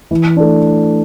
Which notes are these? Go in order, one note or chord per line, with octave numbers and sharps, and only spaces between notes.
E3
A3 D4